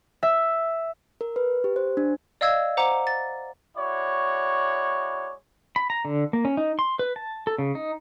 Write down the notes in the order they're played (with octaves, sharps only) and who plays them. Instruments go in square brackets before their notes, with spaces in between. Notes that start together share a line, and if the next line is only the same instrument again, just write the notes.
[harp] E5
[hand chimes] A#4
B4
G4
C5
D4
[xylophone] D5 D#5 F5 E6 G#6
C5 F#5 A#5 D6
A6
[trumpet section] G#3 E4 F#4 C#5 D5
[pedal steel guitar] B5
A#5
D3
A#3
C#4
D#4
C6
B4
A5
A4
C#3
D#4